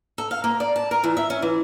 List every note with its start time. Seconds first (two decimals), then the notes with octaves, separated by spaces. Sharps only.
0.18 A4
0.31 F5
0.44 A#3
0.60 D5
0.76 A5
0.91 A#4
1.04 E3
1.17 E5
1.30 C#4
1.42 E3